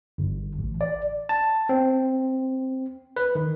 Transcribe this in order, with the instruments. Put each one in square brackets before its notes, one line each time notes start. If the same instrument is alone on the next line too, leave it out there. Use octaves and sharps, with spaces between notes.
[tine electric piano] G1
A1
D5
A5
C4
B4
D#3